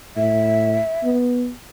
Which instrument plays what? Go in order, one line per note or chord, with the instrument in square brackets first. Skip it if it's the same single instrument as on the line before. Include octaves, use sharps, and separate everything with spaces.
[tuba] A2 [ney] E5
[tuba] B3